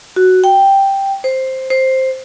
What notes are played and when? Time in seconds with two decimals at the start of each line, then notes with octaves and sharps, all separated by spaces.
0.16 F#4
0.44 G5
1.24 C5
1.70 C5